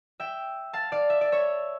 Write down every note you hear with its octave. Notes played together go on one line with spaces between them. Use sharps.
E5 G5
F5 A5
D5 F5
E5
D5
C#5 E5